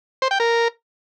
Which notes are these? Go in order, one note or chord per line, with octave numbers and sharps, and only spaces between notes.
C5
G5
A#4